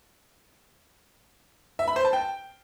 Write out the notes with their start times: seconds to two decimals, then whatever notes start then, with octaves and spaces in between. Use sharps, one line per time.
1.79 E5
1.88 B5
1.96 C5
2.05 A5
2.13 G5